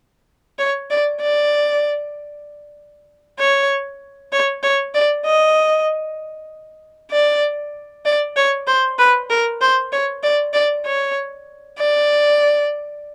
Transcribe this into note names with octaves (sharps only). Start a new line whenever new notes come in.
C#5
D5
D5
C#5
C#5
C#5
D5
D#5
D5
D5
C#5
C5
B4
A#4
C5
C#5
D5
D5
C#5
D5